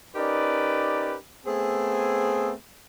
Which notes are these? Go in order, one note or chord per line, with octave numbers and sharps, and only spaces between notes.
C#4 D#4 G4 A#4 B4 D5
A3 B3 C4 G#4